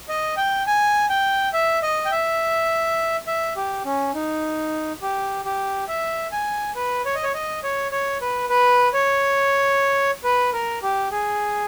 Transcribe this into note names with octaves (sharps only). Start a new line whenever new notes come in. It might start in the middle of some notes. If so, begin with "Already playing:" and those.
D#5
G5
G#5
G5
E5
D#5
G5
E5
E5
G4
C#4
D#4
G4
G4
E5
G#5
B4
C#5
D#5
C#5
D#5
C#5
C#5
B4
B4
C#5
B4
A#4
G4
G#4